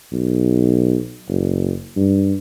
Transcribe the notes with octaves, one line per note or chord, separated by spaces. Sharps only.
B1
F#1
G2